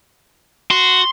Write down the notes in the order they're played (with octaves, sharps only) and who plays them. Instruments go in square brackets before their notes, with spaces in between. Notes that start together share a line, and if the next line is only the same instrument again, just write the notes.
[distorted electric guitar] F#4 [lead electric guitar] C6